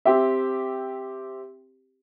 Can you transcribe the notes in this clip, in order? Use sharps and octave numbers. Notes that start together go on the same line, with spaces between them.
C4 G4 E5